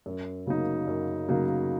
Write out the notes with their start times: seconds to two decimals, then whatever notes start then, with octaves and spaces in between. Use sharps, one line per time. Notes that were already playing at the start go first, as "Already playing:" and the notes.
0.06 F#2
0.46 C#3 F#3 A#3 D#4
0.87 F#2
1.28 C#3 F#3 A#3 D#4